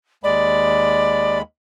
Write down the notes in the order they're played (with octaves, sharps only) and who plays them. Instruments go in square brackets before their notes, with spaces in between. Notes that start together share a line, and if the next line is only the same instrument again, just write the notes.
[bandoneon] D#2 G#3 B5 [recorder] D5